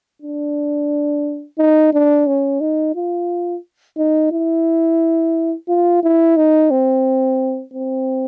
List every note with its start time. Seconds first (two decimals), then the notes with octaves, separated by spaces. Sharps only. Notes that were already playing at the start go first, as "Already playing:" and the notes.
0.22 D4
1.59 D#4
1.93 D4
2.27 C#4
2.61 D#4
2.96 F4
3.98 D#4
4.32 E4
5.69 F4
6.03 E4
6.37 D#4
6.71 C4
7.74 C4